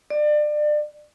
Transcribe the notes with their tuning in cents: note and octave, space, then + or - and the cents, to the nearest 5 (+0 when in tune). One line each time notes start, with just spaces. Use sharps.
D5 +30